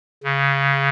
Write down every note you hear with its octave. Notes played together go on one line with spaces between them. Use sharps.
C#3